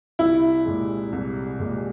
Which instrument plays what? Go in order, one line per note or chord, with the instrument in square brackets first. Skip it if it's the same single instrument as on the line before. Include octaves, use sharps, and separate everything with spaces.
[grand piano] C2 [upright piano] E4
[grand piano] A#2 G#3
C2
A#2 G#3